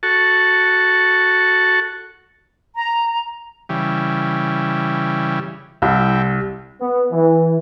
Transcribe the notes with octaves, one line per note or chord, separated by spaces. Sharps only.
F#4 A4 A5 C#6
A#5
C#3 E3 G3
C2 E4 G4
B3
E3